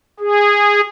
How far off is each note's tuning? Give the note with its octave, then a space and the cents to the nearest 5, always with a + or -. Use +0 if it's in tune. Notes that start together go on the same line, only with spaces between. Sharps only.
G#4 -15